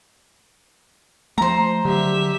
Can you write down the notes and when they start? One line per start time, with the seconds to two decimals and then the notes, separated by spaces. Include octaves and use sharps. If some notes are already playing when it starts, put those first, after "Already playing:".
1.38 F3 A3 C5 A#5
1.85 D3 F#3 G4 E5